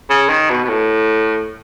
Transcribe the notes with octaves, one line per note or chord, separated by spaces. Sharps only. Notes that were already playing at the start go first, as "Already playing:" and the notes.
C#3
D#3
B2
B2
A2